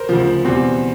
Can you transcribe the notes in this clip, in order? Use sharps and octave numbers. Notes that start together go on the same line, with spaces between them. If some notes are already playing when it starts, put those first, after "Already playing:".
Already playing: A#4 C5
D2 C#3 F3
E2 B2 G3 C4